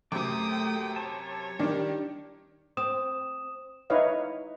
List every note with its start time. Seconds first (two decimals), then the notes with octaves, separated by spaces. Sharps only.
0.12 F#2 C3 A3 G5 D6 D#6
0.96 C#5 A5
1.59 D#3 G3 D4 G4
2.77 C4 D#6 E7
3.90 D#4 E4 B4 C#5 D#5 F5